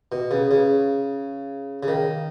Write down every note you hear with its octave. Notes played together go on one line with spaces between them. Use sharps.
B2
C#3
C#3
C#3
D#3